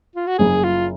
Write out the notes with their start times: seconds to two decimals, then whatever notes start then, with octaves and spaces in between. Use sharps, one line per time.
0.16 F4
0.27 F#4
0.38 F#1 G#4
0.64 F4